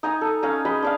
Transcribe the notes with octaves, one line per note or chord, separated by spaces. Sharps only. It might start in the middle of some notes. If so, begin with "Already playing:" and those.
D#4 G#5 A#5 D#6
A4
C#4 F5 G#5 A#5
G#3 D#5 B5
D4 D5 F5